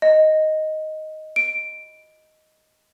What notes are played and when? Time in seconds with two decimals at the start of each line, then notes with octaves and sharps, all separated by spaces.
0.02 D#5
1.36 D7